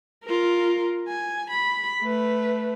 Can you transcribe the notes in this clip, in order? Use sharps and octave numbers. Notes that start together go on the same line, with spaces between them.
F4 A#4
G#5
B5
A3 B4